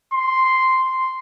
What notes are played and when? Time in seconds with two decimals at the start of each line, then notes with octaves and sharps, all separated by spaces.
0.13 C6